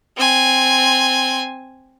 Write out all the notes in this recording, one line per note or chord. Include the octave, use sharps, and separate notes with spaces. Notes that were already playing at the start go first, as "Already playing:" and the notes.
C4 G#5